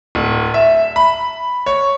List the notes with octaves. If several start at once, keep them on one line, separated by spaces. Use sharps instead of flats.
D1
E5
B5
C#5